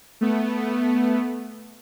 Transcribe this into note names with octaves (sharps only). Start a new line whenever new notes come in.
A3 B3